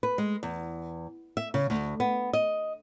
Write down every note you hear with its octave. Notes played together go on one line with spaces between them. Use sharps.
B4
G#3
E2
E5
C#3
D2
B3
D#5